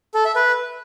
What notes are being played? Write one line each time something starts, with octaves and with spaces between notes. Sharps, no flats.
A4
E5
B4